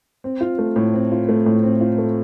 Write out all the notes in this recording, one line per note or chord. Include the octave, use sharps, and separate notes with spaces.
C4
F4
A3
A2
C4
F4
A3
A2
C4
F4
A3